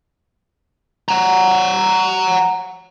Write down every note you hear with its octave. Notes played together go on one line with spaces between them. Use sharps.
F#5 A#5